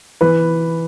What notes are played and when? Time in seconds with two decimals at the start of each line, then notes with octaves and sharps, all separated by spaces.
0.21 E3 B4